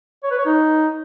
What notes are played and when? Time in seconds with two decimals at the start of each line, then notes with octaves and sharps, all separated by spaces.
0.24 C#5
0.31 B4
0.38 C#5
0.46 D#4